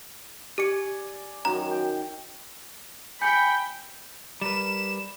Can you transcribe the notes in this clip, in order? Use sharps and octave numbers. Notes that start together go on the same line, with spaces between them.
G4 D5 G#5 C#7
F#2 D#3 F#4 A#5
G5
G5 G#5 B5 G6 C#7
G3 A#4 B4 E7